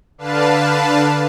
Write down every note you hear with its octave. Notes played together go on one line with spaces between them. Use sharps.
D3 D4 B4 F5 A5